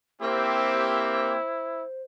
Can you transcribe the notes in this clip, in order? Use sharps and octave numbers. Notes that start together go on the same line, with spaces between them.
A#3 C4 E4 G4 C5